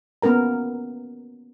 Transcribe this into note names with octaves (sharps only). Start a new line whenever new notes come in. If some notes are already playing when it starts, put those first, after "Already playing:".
A#3 B3 C#4 A#4 A#5